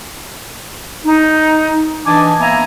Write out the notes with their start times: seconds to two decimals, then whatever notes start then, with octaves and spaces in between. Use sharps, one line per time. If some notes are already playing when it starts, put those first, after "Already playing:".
1.05 D#4
2.06 E3 D4 D#5 G#5 A5 D6
2.40 A#3 B3 E5 G#5 A#5